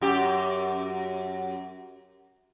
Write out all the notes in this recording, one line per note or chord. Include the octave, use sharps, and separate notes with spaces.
F#2 G4